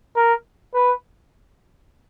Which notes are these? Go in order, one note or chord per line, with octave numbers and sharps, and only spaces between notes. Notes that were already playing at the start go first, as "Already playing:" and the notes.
A#4
B4